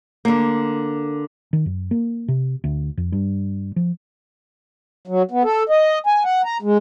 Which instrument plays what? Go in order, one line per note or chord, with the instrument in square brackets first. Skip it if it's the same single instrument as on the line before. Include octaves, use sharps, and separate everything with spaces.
[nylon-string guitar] D3 A#3
[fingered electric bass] D#3
F#2
A#3
C3
D2
F2
G2
F3
[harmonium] F#3
B3
A4
D#5
G#5
F#5
A#5
G#3